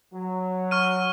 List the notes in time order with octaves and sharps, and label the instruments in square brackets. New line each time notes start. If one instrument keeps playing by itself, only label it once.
[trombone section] F#3
[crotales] C#6 F6 D#7